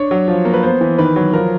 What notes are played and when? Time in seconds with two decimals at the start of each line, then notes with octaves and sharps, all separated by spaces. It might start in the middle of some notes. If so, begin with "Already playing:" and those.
Already playing: D4 C#5
0.11 F#3
0.28 F3
0.45 A#3
0.54 B4
0.63 B3 C5
0.81 E3
0.98 D#3 B4
1.16 F#3
1.33 F3 A#4